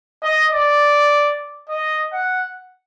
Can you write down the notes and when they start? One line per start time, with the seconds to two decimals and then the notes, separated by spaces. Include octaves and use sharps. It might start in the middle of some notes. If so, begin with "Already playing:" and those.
0.22 D#5
0.52 D5
1.69 D#5
2.13 F#5